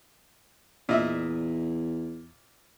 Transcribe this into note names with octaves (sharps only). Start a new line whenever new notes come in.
E2 A#2 D#5 E5